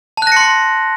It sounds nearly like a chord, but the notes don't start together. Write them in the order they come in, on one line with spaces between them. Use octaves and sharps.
A5 F#6 A#6 C#7 C6